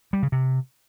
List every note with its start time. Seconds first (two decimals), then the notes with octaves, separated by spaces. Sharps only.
0.13 G3
0.23 C#3
0.32 C3